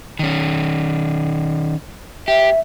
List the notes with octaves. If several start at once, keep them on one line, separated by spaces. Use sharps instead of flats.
D#3 C#4
G4 E5